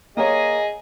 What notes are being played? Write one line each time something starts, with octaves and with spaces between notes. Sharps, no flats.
A#3 G#4 C#5 D#5